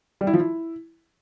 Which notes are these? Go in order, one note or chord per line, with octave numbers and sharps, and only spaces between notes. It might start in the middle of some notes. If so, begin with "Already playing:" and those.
G3
E4
F3
E4